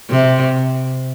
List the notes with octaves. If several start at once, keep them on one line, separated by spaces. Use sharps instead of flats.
C3